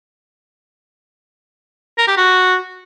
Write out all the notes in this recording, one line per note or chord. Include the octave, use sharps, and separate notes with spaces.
A#4
G4
F#4